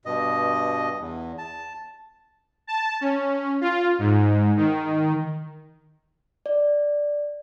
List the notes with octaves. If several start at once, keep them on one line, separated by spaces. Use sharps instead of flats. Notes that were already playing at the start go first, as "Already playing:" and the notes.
G2 B2 D#5
E2
A5
A5
C#4
F4
G#2
D#3
D5